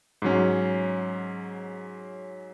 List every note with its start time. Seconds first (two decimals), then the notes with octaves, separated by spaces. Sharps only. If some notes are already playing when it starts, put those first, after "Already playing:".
0.22 G#2 F#3 C#4